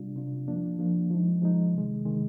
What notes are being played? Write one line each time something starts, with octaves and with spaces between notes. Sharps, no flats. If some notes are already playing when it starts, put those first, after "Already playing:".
Already playing: C3 G3 D4 F4
C3 G3 D4 F4
F3 A#3 D4 F4
F3 A#3 D4 F4
F3 G#3 D#4
F3 G#3 D#4
C3 D#3 G#3
C3 D#3 G#3